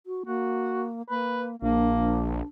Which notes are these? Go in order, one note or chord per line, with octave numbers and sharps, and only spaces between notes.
F#4
A#3 F#4
A#3 B4
A#1 A#3 D4